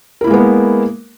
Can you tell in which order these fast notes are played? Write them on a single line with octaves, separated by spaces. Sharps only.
A#4 E4 A#3 G#3 B3